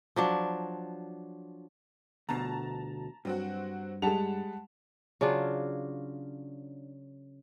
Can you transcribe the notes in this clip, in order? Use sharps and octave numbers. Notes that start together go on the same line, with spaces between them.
F3 F#3 D4
D2 B2 A5 A#5
G2 F#3 C4 F#4
G3 G#3 F#5 A5 F7
C#3 F#3 D4 F4